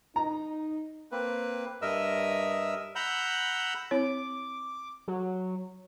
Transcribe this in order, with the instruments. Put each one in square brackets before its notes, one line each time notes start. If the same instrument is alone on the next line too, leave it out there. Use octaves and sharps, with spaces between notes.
[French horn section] D#4 [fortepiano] A#5
[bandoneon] A#3 C4 B4
G2 A#4 D#5 E5 E6
F#5 A#5 B5 E6 G6
[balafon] C4 E4 C#5 [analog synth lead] D6
[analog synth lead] F#3